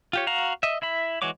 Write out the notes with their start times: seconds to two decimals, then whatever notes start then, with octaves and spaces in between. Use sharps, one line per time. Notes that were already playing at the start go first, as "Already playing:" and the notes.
0.13 F4 G4 C#5
0.27 F#4 F5 A#5
0.63 D#5 E5
0.82 E4 E5 B5
1.22 E3 G#3 F#4 C#5 D6